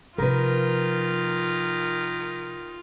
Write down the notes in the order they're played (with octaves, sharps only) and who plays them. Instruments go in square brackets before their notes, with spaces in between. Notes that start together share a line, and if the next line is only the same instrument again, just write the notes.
[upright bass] C3 F3 [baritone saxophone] D#3 [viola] F4 [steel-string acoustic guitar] A#4 B4